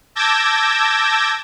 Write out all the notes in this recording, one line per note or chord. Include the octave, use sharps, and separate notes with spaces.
A5 D6 E6 G6 G#6 A#6